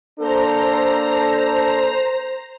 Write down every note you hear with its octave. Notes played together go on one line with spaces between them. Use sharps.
A#3 D4 A4 C5 A#5